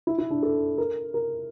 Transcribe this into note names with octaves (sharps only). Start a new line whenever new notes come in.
E4
E4
D4
A4
A#4
A#4